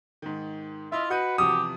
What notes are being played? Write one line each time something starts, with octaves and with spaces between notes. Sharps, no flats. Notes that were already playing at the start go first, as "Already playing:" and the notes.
G#2 D#3
E4 F4 D#5 E5
F#4 B4 D#5 G6 D#7
E2 C3 F3 G4 D#6